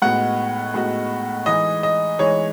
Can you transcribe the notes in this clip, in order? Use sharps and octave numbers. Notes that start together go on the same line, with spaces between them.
A2 G#3 B3 D#4 F#4 F#5
A2 G#3 B3 D#4 F#4
E3 G#3 D#4 D#5
D#5
E3 G#3 D#4 C#5